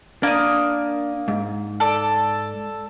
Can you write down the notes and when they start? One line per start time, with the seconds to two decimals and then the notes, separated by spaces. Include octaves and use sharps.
0.23 A#3 D4 D#6
1.28 G#2
1.80 A4 D5